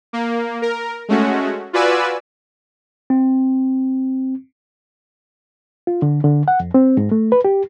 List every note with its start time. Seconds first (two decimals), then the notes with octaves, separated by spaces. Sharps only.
0.13 A#3
0.62 A#4
1.09 G#3 A3 C#4 F#4
1.73 F4 F#4 B4 D5 G#5 E6
3.10 C4
5.87 F4
6.02 D3
6.24 D3
6.48 F#5
6.60 F2
6.74 C4
6.97 G#2
7.12 A3
7.32 B4
7.45 G4